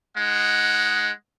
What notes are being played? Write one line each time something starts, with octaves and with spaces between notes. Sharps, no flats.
G#3 D#4 F#5